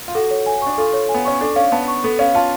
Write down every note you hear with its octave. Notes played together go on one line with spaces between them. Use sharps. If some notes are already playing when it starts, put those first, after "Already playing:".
F4
F#4 A4
C#5
G#5
D4 C#6
F4 A4
C#5
G#5
B3
C#4 C#6
D4 A4
C#4 F5
B3 A5
C#6
B3 A4
C#4 F5
F4 A5